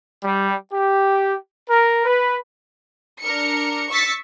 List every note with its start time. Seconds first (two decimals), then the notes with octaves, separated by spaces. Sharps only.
0.24 G3
0.73 G4
1.70 A#4
2.06 B4
3.21 D4 A#4 C#7
3.90 C#6 E6 A6 B6 C#7